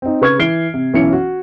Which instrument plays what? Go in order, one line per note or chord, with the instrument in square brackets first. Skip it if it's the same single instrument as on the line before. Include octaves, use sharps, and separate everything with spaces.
[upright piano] C4 D#4
C#3 B4 C#6 F6 G#6
E3 F6 C7 D7 G7
C3
B1 E3 C#4 C#7
F#4